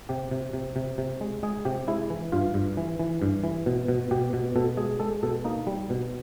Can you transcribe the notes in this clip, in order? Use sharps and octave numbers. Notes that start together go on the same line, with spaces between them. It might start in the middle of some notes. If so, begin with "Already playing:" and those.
C3 G4
C3
C3
C3
C3
G#3
G#3 G#4
C3 G4
G#3 E4
E3
G2 F4
G2
E3
E3
G2
E3
B2
B2
B2 G4
B2
B2 A4
G#3 G#4
G#3 A4
B2 A4
A#3 D#4
G3
B2